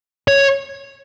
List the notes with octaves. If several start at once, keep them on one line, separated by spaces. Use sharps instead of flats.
C#5